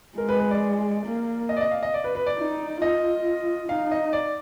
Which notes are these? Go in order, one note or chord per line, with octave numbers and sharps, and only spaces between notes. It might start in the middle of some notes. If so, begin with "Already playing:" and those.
G#3 A#4
B4
B4
D5
A#3
D#5
D5
D#5
F5
D#5
D5
B4
B4
D5
D#4
F4 D#5
D#4 F5
D#5
D5